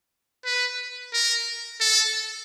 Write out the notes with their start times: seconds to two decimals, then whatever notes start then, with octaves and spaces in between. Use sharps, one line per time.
0.45 B4
1.13 A#4
1.80 A4